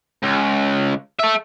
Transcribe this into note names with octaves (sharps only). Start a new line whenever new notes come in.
C#2
A4 E5